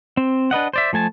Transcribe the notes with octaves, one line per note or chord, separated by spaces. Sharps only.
C4
D4 B4 D#5 F#5
C5 D5 E5
F3 A3 G#5 A5